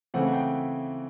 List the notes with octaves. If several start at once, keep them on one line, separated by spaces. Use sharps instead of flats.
C#3 E3 A3 C4 F#5
G5